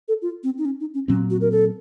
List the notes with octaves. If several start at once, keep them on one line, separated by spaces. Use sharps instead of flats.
A4
F4
C4
D#4
C#4
D#4
C#4
A#2 F#3 C4 C#4
F#4
A#4
A4